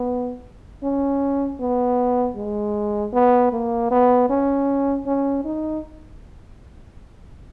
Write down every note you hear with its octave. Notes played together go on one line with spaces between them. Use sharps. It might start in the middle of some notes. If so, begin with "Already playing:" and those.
Already playing: B3
C#4
B3
G#3
B3
A#3
B3
C#4
C#4
D#4